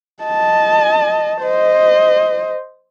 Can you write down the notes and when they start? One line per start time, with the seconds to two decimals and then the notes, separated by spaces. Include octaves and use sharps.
0.23 D#5 A5
1.42 C5 D#5